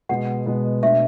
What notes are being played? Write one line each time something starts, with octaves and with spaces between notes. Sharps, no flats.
B2 G#3 B3 F#5
B2 G#3 B3
B2 A3 D4 E5